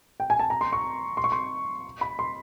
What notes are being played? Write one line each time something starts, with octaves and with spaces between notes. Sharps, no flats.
G5
G#5
A5
A#5
C6
C#6
C6
C#6
C6
B5
C6